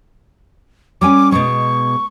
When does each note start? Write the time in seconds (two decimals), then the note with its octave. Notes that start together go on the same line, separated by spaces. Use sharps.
1.01 G3 C#4 G#5 D6
1.32 B2 G#3 C#6